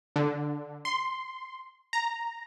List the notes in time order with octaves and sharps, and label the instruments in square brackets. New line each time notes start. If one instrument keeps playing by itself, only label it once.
[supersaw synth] D3
C6
A#5